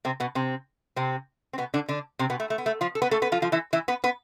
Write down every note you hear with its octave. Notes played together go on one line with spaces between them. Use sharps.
C3 C4
B2 B3
C3 C4
C3 C4
C4
B2 B3
D3 D4
D3 D4
C3 C4
B2 B3
A3
A3
B3
A3
F3 F4
A4
B3 B4
A3 A4
B3 B4
F3 F4
F3 F4
E3 E4
E3 E4
B3 B4
B3 B4